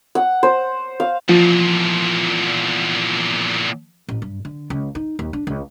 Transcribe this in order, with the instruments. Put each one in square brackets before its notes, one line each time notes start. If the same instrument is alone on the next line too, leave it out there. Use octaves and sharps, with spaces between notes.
[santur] F#5
C5
F5
[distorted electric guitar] E2 A#2 [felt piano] F3
[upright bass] A1
G2
D3
C#2
D#4
D#2
D4
C#2